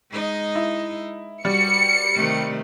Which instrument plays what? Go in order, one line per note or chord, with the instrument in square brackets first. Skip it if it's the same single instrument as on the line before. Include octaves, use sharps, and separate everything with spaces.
[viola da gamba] G#3 D#4 D#5
[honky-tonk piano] E4
[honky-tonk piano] G3 [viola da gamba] F#4 [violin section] C#7
[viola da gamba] C3 D#3 A3